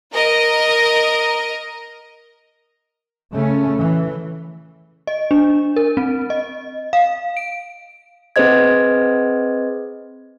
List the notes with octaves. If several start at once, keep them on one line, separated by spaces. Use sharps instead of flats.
A#4 D#5
C#3 A3 C#4
E3
D#5
D4
A#4
C4
D#5
F5
D7
C4 G#4 B4 C5 D#5 G#6